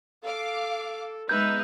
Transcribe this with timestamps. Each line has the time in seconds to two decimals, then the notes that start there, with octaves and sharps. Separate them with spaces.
0.24 A4 F5 D6
1.29 G#3 B3 D#4 B4 E5 G6